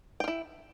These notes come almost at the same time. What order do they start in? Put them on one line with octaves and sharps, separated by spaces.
G5 F4 E4